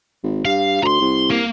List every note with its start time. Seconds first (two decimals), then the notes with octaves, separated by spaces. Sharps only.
0.24 G#1
0.45 G2 F5
0.83 D2 A#5 C6
1.01 C2
1.30 A#3 A#4